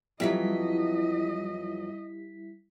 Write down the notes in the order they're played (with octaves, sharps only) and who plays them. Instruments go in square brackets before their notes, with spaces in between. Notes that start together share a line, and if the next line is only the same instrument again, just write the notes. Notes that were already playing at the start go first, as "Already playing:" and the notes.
[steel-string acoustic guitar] F2 E3 F#3 [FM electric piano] G3 E4 B6 [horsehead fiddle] D#5